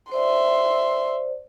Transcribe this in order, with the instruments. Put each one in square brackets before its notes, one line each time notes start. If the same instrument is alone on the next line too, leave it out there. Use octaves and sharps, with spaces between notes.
[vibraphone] C5 D5 [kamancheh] E5 C6